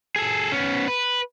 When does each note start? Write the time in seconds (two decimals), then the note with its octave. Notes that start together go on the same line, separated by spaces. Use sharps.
0.16 G#4 A4
0.52 B3 C#4
0.88 B4